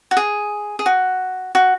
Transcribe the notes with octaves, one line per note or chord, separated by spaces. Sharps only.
F#4
G#4
G#4
F#4
F#4